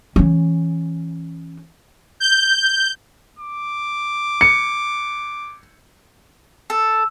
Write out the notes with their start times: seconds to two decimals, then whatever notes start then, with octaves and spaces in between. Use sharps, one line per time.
0.16 E3 C#4
2.20 G6
3.39 D6
4.41 C#7
6.70 A4